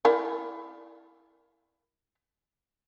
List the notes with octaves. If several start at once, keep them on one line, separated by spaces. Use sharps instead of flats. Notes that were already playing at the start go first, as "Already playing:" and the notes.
E4 A#4 D5